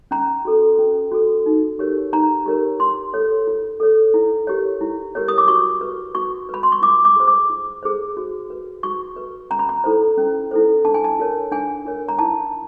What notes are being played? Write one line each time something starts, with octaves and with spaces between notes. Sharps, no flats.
C#4 A#5
F#4 A4
C#4
F#4 A4
D#4
G4 A#4 C#5
D#4 A#5
G4 A#4 C#5
F4 C6
A4 C#5
F4
A4 C#5
E4
G4 A#4 C#5
E4
G4 A#4 C#5
D#6
D6
F#4 C#6
B4
F#4 C#6
B4 B5
C6
C#6
F4 D6
D6
G#4 C5
D6
F4
G#4 C5
F#4
B4
F#4 C#6
B4
C#4 A#5
B5
A#5
E4 A4 C5
C#4
E4 A4 C5
D4 A5
G#5
A5
F4 A#4 C#5
D4 G#5
F4 A#4 C#5
A#5
E4 A5